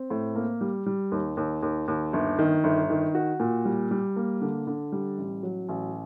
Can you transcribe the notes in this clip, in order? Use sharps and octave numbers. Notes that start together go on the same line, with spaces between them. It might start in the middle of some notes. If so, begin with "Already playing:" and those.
Already playing: C4
A2
A#3
G3
G3
D#2
D#2
D#2
D#2
G1
D#3
G1
D#3
F#4
A#2
G3
G3
A#3
D3
D3
G3
A1
F#3
A1